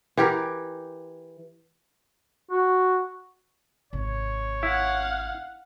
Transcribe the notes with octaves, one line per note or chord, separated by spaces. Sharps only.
E3 G4 A#4
F#4
G#1 C3 C#5
E4 F5 F#5